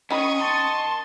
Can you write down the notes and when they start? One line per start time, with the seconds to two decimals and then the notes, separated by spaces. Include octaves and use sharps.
0.11 D#3 C#4 B5 C#6 D#6
0.40 A5 C6